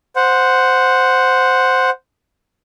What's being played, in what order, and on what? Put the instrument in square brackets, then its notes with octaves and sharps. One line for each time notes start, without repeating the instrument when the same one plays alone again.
[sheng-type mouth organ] C5 F#5